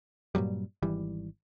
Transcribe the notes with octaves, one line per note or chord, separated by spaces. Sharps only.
G2 A#2 F#3 G3
G#1 E3 G3